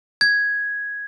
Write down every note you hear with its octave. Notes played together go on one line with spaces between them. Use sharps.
G#6